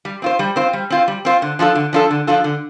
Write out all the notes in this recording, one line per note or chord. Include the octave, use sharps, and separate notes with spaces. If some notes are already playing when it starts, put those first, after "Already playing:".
G3
C4 F4 C5
G3
C4 F4 C5
G3
C4 F4 C5
G3
C4 F4 C5
D3
F3 D4 F4 A4
D3
F3 D4 F4 A4
D3
F3 D4 F4 A4
D3